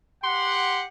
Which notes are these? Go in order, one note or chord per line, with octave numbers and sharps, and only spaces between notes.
G4 F#5 C6